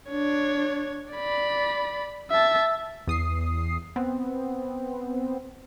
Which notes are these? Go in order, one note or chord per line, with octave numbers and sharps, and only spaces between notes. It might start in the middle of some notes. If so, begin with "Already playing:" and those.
D4 C#5
D5 B5
E5 A5
E2 D#6 C7
B3 C4